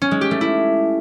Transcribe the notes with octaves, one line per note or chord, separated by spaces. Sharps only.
C#4
G#3
G4
A3
E4